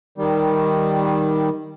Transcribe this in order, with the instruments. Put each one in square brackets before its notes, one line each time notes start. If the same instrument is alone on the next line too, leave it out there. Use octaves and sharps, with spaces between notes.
[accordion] D#3 G3